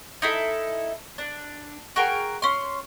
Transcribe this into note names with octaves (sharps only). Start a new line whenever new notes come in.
D#4 E4 A4
D4
F#4 G#4 A#4 G5
C#4 C6